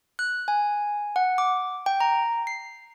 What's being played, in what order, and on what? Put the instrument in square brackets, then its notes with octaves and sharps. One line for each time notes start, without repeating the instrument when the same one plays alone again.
[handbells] F#6
G#5
F#5
D6
G5
A#5
C7